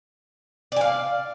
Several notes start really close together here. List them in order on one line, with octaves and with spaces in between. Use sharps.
D5 G#5 F5